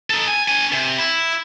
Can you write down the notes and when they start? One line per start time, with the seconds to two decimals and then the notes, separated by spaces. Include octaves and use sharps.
0.10 D#4 A4
0.28 G#5
0.48 D4 G#5
0.72 C3
0.98 E4